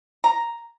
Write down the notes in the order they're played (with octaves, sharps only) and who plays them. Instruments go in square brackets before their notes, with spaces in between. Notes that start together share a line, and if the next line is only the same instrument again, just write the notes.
[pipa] A#5